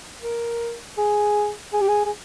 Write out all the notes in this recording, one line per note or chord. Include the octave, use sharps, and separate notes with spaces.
A#4
G#4
G#4
G4
G#4
G#4